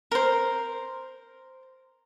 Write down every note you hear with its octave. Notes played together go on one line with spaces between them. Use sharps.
A#4 C5